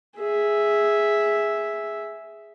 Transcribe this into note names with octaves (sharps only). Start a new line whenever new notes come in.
G#4 E5